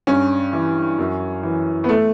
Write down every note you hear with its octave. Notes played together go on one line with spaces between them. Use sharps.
G2 C#4
E3
F#2
E3
B3
A3